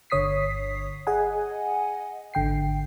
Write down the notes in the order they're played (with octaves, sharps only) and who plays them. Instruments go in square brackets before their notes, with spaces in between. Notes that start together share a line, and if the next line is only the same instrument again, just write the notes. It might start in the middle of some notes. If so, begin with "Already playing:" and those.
[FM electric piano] G1 D3 C#5 D#6 B6 C7
G#4 D#5 F#5 G#5
G#1 D3 G5 C7